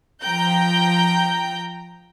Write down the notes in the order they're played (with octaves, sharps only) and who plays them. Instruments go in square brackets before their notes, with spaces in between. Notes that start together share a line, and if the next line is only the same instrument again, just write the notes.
[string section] F3 G5 A#5 G6